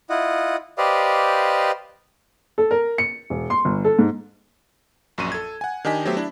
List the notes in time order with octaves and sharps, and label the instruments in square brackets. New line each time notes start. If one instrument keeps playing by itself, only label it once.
[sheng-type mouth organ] E4 F4 D#5 F#5
G4 B4 C5 D5 D#5 F5
[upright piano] A4
A#4
C#7
E1
C6
G1
A4
G#2
[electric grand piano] A#1 F#2 C#6 D#7
A4 G#6
F#5 G#5
D#3 D4 G4 D#5 G#5 B6
F#3 A3 B3 G4 C5 E5
D4 E4